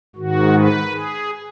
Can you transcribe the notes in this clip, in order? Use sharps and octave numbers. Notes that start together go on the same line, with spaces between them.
G#2 D#3 F#4
B4
G#4